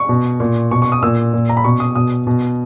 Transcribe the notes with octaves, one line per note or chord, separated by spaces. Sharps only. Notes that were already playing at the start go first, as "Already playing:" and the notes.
Already playing: C#6
B2
A#2
B2 C#6
C#6
D#6
A#2 E6
A#2
A#5
B5
B2 C#6
D#6
B2 D#6
B2